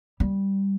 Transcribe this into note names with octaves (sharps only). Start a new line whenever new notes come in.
G3